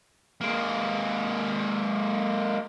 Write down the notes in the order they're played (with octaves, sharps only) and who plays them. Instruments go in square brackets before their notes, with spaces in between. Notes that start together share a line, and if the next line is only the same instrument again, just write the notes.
[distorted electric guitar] G#3 A#3